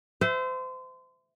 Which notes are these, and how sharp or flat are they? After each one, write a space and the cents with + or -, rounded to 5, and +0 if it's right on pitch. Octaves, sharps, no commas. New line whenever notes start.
C5 -30 E5 +0